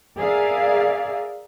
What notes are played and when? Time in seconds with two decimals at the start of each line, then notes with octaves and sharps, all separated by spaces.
0.17 G#4 A#4 D5 E5 F5